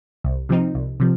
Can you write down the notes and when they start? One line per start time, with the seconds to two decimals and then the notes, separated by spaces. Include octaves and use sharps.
0.24 C2
0.49 C3 F3 C4 D#4
0.75 C2
1.00 C3 F3